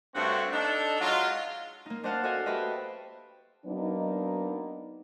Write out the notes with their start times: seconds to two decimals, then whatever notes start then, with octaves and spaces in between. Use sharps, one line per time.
0.15 G2 A3 C4 F#4 C#5 F#5
0.52 D4 D#4 A4
1.00 F#3 G#3 F4
1.86 A#3 D#4
2.04 D4 C5 D#5 F5 F#5 A5
2.23 F#4 A4 C5 D#5 F5 G#5
2.46 F#4 G4 B4 C5 D#5 E5
3.66 F#3 A#3 B3 D4 D#4